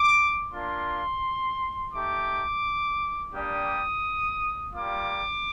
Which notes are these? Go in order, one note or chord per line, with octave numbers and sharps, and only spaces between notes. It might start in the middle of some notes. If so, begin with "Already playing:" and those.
Already playing: D6
A#3 D4 F4 C6
A3 D#4 G4 D6
G3 A#3 D4 G4 D#6
G3 A#3 F4 D6